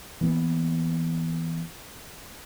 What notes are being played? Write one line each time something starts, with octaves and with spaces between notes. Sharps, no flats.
E3 A#3 B3